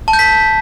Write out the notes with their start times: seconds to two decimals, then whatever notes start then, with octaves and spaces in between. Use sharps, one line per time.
0.08 A5
0.13 G6
0.19 B6